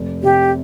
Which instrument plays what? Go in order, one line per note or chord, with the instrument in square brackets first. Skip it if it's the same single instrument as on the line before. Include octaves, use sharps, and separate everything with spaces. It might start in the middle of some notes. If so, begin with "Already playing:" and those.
Already playing: [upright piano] F1
[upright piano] C3 [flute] G4